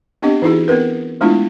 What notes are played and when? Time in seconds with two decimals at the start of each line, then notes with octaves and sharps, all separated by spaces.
0.22 B3 C4 D4 G4 D#5
0.42 E3 D#4 E4 F#4 G#4
0.68 B3 C4 A#4 B4
1.21 G#3 A3 B3 D4 E4 F4